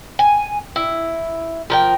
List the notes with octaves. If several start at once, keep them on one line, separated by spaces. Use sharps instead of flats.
G#5
E4
F3 A#4 G5